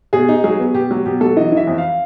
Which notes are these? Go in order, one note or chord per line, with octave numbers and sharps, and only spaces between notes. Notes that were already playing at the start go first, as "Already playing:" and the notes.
B2 G#4
D#4
F#3 G#4
B3
B2 G4
F#3
B2 G4
F#3 A4
E3 D#5
E3 E5
F2
F5